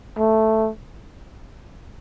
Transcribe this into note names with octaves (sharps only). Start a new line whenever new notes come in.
A3